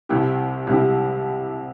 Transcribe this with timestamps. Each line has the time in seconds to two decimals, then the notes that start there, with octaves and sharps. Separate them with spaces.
0.09 C2 C3 G3 E4 G4
0.67 C2 C3 G3 E4 G4